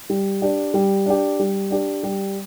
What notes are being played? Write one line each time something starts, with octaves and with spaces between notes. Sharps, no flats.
G3
D4 G4
G3
D4 G4
G3
D4 G4
G3